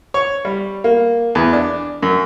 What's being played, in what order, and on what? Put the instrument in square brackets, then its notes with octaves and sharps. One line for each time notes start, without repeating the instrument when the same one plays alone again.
[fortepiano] C#5
G3
A#3
E2
D4
F#2